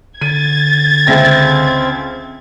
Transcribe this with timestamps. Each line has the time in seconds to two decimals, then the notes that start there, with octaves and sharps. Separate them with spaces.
0.21 D3 G#6 A6 D#7
1.07 C#2 C4 E5 A#6